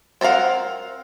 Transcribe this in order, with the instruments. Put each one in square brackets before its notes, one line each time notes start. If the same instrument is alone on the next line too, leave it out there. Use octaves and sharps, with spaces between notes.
[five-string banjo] C4 A4 A#4 F5 F#5